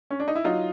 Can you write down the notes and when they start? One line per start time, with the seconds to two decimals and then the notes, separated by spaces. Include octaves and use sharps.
0.11 C#4
0.20 D4
0.28 D#4
0.35 E4
0.44 F#3 D#4 F4